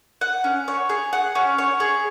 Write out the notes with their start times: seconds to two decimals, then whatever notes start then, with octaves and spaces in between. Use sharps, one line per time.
0.21 F#5
0.44 C#4
0.68 C#5
0.89 G#4
1.13 F#5
1.35 C#4
1.58 C#5
1.80 G#4